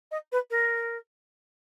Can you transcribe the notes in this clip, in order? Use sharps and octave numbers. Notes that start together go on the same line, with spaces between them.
D#5
B4
A#4